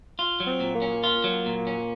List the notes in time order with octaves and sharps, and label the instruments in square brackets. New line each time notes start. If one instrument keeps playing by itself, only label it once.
[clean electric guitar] F4
F#3
[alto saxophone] C4
[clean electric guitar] A#2
[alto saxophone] A#3
[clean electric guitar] C#4
F4
F#3
A#2
C#4